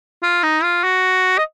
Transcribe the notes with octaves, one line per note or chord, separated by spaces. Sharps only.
F4
D#4
F4
F#4
D#5